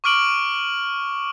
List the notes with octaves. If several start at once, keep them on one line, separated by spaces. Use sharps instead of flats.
C#6 D6 F6 D7 F#7